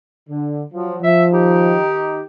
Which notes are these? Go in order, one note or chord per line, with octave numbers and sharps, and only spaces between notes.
D3
F3 F#3
F3 E5
D#3 D#4 G4